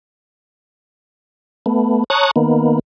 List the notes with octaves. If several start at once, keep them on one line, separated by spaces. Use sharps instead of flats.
A3 B3
C#5 A5 A#5 C#6 D#6 F#6
D#3 A#3 B3